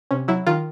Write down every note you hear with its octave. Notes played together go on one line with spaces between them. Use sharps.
C3 C#4
F#3 E4
D#3 F4